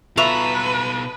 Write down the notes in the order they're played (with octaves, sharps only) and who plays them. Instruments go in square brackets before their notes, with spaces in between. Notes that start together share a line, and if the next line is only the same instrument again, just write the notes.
[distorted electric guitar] B2 A4 [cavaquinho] F4 E5 C#6 [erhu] B4 [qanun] A#5